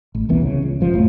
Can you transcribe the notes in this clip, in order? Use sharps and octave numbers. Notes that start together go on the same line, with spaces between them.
A1
D#1 C2 E3 B3
C#3
C#2
G#1 F3
F1 A2